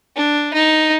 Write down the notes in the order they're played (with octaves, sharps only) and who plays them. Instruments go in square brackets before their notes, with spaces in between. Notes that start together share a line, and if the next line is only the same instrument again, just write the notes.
[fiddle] D4
D#4